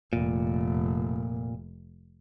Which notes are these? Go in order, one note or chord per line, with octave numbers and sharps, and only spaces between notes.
F1 A#2